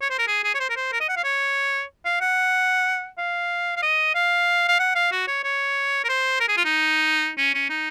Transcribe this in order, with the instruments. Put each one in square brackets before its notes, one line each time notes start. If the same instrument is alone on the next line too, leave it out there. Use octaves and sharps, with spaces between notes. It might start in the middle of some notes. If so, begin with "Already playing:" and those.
[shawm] C#5
C5
A#4
G#4
G#4
C#5
C5
A#4
C5
A#4
D#5
F#5
F5
C#5
F5
F#5
F5
F5
D#5
F5
F5
F#5
F5
F#4
C#5
C#5
A#4
C5
A#4
G#4
F4
D#4
C#4
C#4
D#4